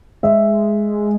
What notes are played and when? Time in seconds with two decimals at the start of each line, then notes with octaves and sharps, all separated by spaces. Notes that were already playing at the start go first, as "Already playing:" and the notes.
0.23 G#3 E5